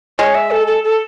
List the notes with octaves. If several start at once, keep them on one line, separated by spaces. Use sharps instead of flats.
G#3 C#5
E5
A4
A4
A4